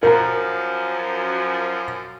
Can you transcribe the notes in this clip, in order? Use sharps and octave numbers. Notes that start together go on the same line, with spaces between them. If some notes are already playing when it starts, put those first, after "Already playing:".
F#2 F3 A#4 A#5